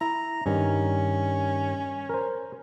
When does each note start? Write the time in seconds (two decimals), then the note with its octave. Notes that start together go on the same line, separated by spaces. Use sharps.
0.01 E4 A#5
0.46 G2 D#3 C#4
2.09 A#4 C5